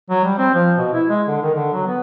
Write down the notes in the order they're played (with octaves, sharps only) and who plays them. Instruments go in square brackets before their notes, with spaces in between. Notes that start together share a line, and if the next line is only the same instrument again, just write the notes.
[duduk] F#3
G3
C4
F3
B2
E4
G#3
D3
D#3
D3
F#3
B3